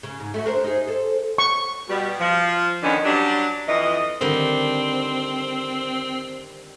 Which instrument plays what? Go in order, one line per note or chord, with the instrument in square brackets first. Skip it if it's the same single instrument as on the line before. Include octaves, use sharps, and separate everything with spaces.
[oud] C#3
G#2
A3 E4 F#4
D4 A#4 C5
D#4 G#4
A4 C5
[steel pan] C#6
[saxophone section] B2 G3
F3
D3 D#3 B3 C#4 D4
F#3 G3 D4
F2 E3 D#5
[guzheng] D3 D#3 G3 [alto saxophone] C4